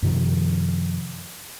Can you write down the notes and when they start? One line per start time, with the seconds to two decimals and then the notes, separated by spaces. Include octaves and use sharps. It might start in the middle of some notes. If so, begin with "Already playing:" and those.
0.02 F#2 C3 D#3 F3